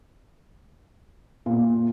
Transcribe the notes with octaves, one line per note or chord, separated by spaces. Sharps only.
A#2